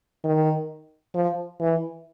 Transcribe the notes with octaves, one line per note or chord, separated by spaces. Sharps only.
D#3
F3
E3